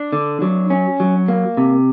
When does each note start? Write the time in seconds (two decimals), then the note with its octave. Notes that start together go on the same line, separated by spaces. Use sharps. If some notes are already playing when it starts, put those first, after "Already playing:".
Already playing: D4
0.13 D3
0.42 F#3
0.70 C#4
1.00 F#3
1.28 A#3
1.57 C3